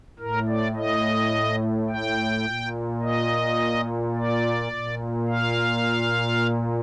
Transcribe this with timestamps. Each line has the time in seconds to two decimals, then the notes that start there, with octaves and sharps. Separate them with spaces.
0.19 A2 A#4
0.48 D5
0.76 D#5
1.89 G5
2.46 A#2
3.02 D#5
4.15 D5
4.72 A#2
5.28 F5